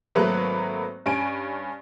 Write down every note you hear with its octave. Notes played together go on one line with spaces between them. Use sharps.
G#1 F#3 A3 A#3 B4 F#6
G2 C#4 G#5 D7